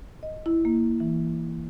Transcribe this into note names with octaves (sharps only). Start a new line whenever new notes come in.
D#5
E4
A#3
E3